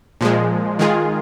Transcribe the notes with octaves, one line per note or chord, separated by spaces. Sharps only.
A#2 F3 G#3
D#3 G#3 F4 G#4